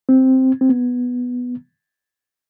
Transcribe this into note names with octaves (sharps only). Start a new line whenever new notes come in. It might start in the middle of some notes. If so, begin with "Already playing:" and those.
C4
C4
B3